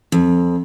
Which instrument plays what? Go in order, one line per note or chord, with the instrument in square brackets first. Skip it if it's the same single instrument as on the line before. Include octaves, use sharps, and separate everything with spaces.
[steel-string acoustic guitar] F2